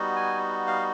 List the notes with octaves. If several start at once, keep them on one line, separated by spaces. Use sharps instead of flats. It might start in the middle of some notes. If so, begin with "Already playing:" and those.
Already playing: G3 B3 D#4 F#4
G#5
F5